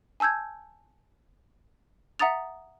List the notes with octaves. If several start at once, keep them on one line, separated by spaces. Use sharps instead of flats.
G#5 A5 E6 G6 G#6
E5 F#5 A#5 D#6 A6 F7